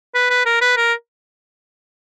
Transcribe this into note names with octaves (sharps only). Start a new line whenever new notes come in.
B4
B4
A#4
B4
A#4